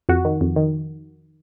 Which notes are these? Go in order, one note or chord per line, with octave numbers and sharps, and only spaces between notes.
F2 F#4
D#3
F2
D#3